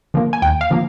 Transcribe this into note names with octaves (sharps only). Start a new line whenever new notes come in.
D3 F3 A#3
G#5
D#2 G5
F5
D3 F3 A#3